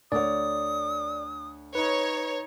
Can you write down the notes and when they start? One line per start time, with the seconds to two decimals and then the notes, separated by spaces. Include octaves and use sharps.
0.12 D2 C#5 D5 D#6
1.75 D#4 B4 C#5